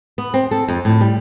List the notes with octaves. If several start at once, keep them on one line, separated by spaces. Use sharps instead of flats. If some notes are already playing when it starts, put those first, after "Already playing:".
B3
C4
A4
F2
A2
G3